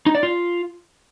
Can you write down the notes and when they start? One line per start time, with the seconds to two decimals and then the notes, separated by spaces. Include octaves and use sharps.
0.06 D#4
0.15 D5
0.23 F4